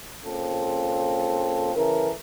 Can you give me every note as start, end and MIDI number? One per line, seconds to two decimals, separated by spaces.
0.24 1.73 49
0.24 1.73 58
0.24 1.73 60
0.24 1.73 65
0.24 1.73 69
1.74 2.10 49
1.74 2.10 52
1.74 2.10 69
1.74 2.10 70